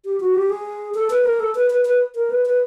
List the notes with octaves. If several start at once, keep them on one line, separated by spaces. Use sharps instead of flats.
G4
F#4
G4
G#4
A4
B4
A#4
A4
B4
B4
B4
A#4
B4
B4